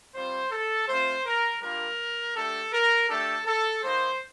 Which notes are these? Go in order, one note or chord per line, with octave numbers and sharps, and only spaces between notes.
G3 C4 F4 C5
A4
A3 C4 F4 C5
A#4
G3 A#3 D4 F4 A#4
A3 D4 G4 A4
A#4
A3 D4 G4 A4
A4
G3 A#3 D#4 C5